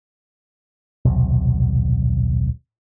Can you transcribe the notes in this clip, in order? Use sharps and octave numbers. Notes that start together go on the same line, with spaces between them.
D#1 B1 C3